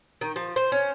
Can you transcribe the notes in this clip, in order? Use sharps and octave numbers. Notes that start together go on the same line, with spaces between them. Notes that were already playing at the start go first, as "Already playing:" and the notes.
D#3
F3
C5
C#4